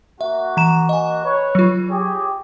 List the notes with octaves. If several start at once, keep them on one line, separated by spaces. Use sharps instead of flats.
A#3 F#4 E5
E3 A#5 E7
D#5 G#5
B4 C#5
F#3 F4
G4 G#4 C#5